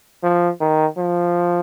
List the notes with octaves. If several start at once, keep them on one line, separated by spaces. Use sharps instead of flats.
F3
D#3
F3